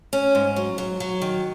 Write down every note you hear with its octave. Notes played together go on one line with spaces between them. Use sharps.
C#4
G#2
F#3
F#3
F#3
D#3